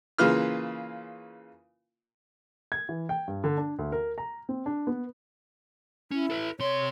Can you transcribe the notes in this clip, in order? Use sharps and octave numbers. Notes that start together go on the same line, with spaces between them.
C#3 E3 A#3 F4 B4 F6
G#6
E3
G5
G2
D3
D4
D2
A#4
A#5
C4
D4
B3
C#4 E4
A4 B4
C3 C#5 C6